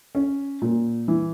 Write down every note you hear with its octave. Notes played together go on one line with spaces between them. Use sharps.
C#4
A#2
E3